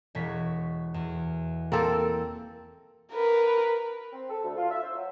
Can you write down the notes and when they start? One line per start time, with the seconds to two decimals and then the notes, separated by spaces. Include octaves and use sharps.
0.15 E1 C#5 B6
0.94 E2
1.72 A#3 C4 A4
3.13 A#4 B4
4.13 C4
4.30 A4
4.43 D2
4.57 F4
4.70 E5
4.83 C5
4.95 F#3